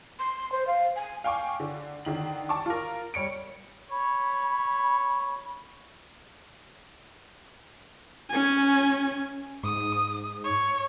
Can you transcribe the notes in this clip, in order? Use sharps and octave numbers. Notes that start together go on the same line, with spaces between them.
C6
C5
F5
G#5
F5 G5 G#5 C#6 D6
D3
D3 D#3 F#7
A5 C#6 D6
F4 A#4
G3 C#5 C#7 D7
C#5 B5
C#4 G#5
G#2 D#6
C#5